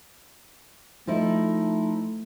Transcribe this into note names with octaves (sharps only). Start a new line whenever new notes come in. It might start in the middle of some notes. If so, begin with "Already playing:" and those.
F3 A3 D#4 E4